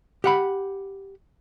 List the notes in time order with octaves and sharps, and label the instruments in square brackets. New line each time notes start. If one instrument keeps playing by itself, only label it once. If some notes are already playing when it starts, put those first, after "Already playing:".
[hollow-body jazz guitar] G4 F#5 B5